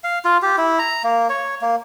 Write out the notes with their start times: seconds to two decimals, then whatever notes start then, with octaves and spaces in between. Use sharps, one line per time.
0.04 F5
0.25 F4
0.42 G4
0.58 E4
0.79 A#5
1.04 A#3
1.30 C#5
1.61 A#3